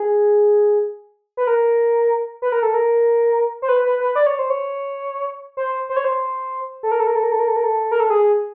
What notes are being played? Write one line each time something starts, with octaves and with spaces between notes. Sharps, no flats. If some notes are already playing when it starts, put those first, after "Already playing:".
Already playing: G#4
B4
A#4
B4
A#4
A4
A#4
C5
B4
B4
B4
D5
C#5
C5
C#5
C5
C5
C#5
C5
A4
A#4
A4
A#4
A4
A#4
A4
A#4
A4
A#4
A4
A#4
A4
G#4